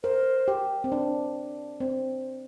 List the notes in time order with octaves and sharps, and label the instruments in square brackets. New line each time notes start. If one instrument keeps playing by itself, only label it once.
[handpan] A#4 [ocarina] C5
[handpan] G4
C4
D4
C4